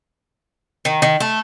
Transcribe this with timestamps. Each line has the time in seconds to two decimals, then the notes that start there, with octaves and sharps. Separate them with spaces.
0.85 D#3
1.02 D#3
1.20 A3